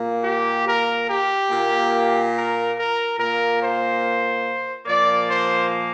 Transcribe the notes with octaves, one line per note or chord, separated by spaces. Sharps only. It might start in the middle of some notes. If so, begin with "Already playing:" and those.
Already playing: A#2 A#3
G4
A#4
G4
A#2 A#3
A#4
A#4
A#2 A#3 A#4
C5
A#2 F3 A#3 D5
C5